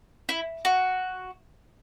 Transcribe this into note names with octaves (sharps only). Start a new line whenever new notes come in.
E4
F#4